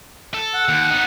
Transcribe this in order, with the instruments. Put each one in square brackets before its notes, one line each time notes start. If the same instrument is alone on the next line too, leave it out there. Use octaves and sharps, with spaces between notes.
[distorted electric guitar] A4
[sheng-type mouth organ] F#5
[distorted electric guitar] D#2
B3 D#4